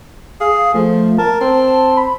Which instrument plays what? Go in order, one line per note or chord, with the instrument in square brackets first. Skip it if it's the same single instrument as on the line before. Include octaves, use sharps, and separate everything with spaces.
[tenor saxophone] G#4 [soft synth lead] F5
[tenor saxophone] F3 [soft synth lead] A3
[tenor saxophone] A#4 [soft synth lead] A5
[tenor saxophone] C4
[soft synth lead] B5